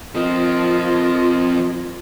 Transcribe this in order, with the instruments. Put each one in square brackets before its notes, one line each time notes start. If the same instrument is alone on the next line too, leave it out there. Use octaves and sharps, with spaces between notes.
[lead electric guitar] F2 C4 [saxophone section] F3 A#4 D#5 [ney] F4